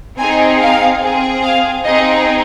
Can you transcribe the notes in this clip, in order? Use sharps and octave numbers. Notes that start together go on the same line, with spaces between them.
C4 D#4 G#4 G#5
F5
C4 G#4
F5
C4 D#4 G#4 D#5